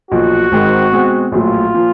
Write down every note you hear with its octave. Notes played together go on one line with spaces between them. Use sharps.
B1 A#2 F3 F#4
G#1 G#2 D#3 G#3 C4
B2 G#3 C4
A#1 A2 F#3 F4
A#2 F3